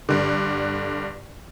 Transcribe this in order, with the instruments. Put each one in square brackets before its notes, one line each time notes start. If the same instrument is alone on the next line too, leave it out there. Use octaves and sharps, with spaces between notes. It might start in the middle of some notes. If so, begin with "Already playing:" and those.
[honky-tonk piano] G2 D3